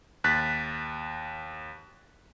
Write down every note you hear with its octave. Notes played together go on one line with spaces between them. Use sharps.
D#2 F#6 A6 B6